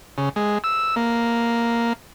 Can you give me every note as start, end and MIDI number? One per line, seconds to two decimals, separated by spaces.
0.18 0.29 49
0.36 0.58 56
0.64 0.95 88
0.96 1.93 58